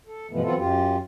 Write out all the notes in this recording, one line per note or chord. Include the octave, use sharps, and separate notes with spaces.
A4
G2 B2 E3 F3 A3 B3
E3 F#3 B3 C4 F4 A4
F#2 F4 G4